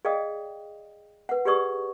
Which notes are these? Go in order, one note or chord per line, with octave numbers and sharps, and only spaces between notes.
G#4 D5 D#5 F5 G5 D#6
B4 F#5
G4 G#4 B4 D5 C#6 D#6